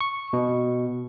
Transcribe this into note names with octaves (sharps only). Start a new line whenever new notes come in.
C#6
B2